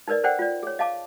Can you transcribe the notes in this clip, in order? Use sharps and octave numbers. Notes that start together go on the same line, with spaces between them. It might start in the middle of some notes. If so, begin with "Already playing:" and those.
D#4 A#4 B4 D5 D#5
A4 B4 C5 D5 F#5 G5
F4 D5
G#4 C#5
D#5 F5 A5 D6